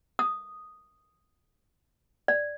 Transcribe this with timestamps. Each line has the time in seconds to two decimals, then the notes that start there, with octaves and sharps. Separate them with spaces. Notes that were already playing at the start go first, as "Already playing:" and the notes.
0.19 D#6
2.28 D5